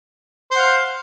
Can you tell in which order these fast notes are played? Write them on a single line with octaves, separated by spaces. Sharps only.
C5 F#5 F5